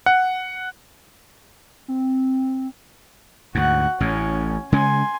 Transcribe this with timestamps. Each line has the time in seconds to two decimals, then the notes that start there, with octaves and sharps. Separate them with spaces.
0.06 F#5
1.88 C4
3.55 D2 G#2 F#4 F#5
4.00 A1 A2 C#4
4.72 C#3 G#3 C#4 G#5 C6